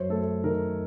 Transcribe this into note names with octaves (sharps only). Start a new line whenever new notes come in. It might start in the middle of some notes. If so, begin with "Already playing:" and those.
Already playing: F#2 C5 C#5
A3 A4
D#3 A#4